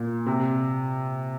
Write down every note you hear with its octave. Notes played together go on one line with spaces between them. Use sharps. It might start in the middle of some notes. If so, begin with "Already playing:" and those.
Already playing: A#2
C3